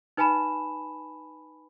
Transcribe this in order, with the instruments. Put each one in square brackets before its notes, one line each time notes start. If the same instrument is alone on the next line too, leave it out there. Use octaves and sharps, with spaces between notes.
[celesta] D#4 B4 G#5 A5 B5 E7